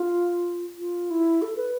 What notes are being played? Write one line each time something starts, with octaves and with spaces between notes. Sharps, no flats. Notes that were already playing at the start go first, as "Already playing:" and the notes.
Already playing: F4
F4
E4
A4
B4